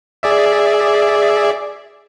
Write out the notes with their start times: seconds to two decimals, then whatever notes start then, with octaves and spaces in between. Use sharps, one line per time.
0.23 G#4 D5 E5